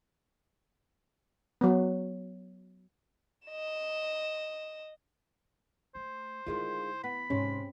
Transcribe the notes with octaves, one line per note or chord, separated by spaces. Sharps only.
F#3 B3
D#5 E7
A3 C5
D3 D#3 G#3 E4 F4
B3 B5
G#2 C3 C#4